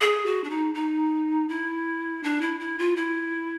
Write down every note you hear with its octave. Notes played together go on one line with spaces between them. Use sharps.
G#4
F#4
D4
D#4
D#4
E4
D4
E4
E4
F4
E4